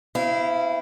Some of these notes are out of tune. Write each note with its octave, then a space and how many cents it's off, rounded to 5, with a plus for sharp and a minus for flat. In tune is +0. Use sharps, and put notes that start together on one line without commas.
C4 -30 E4 +0 F5 -30